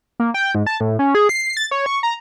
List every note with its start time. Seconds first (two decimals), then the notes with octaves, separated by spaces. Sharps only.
0.20 A#3
0.34 G5
0.55 G#2
0.66 A5
0.80 A2
0.99 C#4
1.15 G#4
1.29 C7
1.57 A6
1.71 C#5
1.86 C#6
2.03 A#5